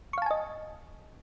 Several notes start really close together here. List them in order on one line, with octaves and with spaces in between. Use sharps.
C#6 F5 A5 G#5 D#5